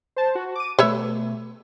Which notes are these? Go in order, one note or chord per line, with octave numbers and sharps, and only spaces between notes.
C5 A5
F#4
D6 D#7
B2 A3 B4 C#5 E5